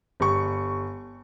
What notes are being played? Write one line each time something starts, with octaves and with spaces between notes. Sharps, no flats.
G1 G3 C#6